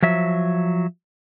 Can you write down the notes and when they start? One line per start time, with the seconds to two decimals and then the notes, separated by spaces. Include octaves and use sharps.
0.03 F3 F#3 E5